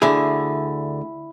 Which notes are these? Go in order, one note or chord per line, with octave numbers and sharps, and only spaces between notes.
D2 D3 E4 G#4 E5 B5